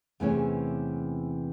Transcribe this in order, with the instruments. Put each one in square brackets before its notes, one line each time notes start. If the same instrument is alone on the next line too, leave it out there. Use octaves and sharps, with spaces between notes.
[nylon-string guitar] E2 C3 E3 A3 C#4